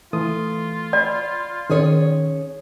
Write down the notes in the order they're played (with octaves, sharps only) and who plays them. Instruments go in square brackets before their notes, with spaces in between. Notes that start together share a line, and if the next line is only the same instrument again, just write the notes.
[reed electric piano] E3 A3 D#6 [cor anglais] F4
[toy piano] D5 [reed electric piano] B5
[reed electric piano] D#3 D#6 [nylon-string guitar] C#4 G#4 C#5